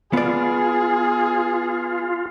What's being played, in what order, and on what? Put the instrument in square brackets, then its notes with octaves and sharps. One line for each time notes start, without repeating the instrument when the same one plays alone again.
[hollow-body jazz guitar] B3 D5 [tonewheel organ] F4 [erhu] G#4